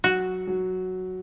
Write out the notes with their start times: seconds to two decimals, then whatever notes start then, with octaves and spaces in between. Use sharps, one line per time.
0.04 F#3 F#4
0.47 F#3